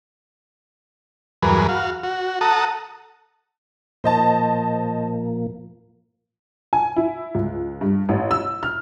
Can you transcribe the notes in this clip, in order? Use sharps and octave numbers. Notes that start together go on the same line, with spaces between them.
E2 G2 F#3 G#4 A#4 B4
F#4 F5
F#4
A4 F#5 A5 A#5 D#6
A#2 F3 A#3 C5 D#5 A5
G#5
E4
C#2
G2
A1
E6
F6